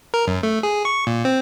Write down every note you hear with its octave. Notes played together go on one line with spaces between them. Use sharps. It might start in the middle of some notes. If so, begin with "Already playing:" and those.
A#4
F#2
A3
G#4
C#6
A#2
C4